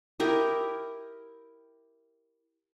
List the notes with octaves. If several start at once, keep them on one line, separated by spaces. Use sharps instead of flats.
E4 G4 A#4 D#5